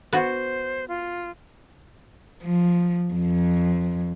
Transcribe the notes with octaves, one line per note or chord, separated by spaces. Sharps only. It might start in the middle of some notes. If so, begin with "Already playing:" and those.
B3 F#4 C5
F4
F3
F2